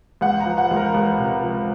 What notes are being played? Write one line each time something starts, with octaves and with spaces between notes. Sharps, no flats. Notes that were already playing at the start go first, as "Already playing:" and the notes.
C#2 F#5
A#5
F3
F#5
C#2
A#4
C#2
C3
F3